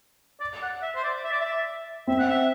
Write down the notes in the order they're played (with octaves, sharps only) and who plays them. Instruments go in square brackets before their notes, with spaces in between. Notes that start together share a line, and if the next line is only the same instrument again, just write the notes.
[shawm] D5
F#5
E5
C5
D5
E5
D5
E5
[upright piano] C4 [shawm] E5
[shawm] F#5
E5